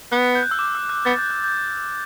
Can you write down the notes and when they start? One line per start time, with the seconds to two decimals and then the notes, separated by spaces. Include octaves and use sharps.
0.12 B3 F#6
0.35 G6
0.43 F#6
0.51 E6
0.59 D6
0.75 E6
0.89 F#6
1.05 B3 A6
1.18 G6
1.31 F#6
1.44 G6